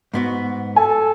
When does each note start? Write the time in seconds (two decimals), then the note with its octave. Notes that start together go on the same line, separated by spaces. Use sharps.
0.14 G#2 B3 F#4
0.76 A4 G#5